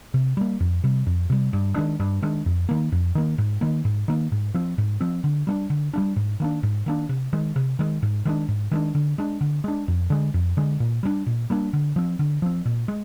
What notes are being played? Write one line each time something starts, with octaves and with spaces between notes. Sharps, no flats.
C3
G3 A#3
F2
C3 G3
F2
C3 G3
G2
D#3 G#3 D4
G2
D#3 G#3 D4
F2
D#3 A#3
F2
D#3 A#3
G#2
D#3 A#3
G#2
D#3 A#3
G#2
F3 C4
G#2
F3 C4
D3
G3 A#3 D4
D3
G3 A#3 D4
G#2
D#3 A#3 D4
G#2
D#3 A#3 D4
C3
D#3 G#3
C3
D#3 G#3
G#2
D#3 G#3 D4
G#2
D#3 G#3 D4
D3
G#3 D4
D3
G#3 D4
F2
D3 G#3
F2
D3 G#3
A#2
G3 A#3 D4
A#2
G3 A#3 D4
D3
F3 C4
D3
F3 C4
A#2
G#3